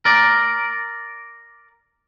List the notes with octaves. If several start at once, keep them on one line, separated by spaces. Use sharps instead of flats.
A#4 D5